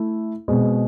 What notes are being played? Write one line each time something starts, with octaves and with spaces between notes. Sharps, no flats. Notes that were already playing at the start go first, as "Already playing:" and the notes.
Already playing: A3 E4
B2 G#3 C4